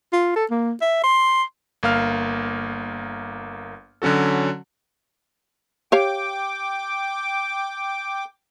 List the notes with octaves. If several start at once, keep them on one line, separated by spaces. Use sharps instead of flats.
F4
A4
A#3
E5
C6
G1 A#3 F5 F6
D3 F#3 C#4 F#4 A4
G4 C#5 F5 G5 D6